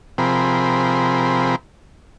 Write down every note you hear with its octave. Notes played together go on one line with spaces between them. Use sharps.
C3 F3 C4 G#4 A#4 B5